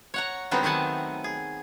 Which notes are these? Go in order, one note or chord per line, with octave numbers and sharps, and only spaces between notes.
C#5 F#5 A#5
D3 F#3 G3 B3 C4 D#4
D#3 A3 F#5 G#5 A5
G#4